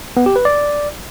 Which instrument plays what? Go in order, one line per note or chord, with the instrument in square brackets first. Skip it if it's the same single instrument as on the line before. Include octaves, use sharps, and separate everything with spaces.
[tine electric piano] B3
G4
B4
D5